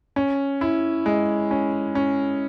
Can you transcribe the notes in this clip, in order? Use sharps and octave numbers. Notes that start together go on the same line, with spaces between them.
C#4
E4
G#3
C#4
C#4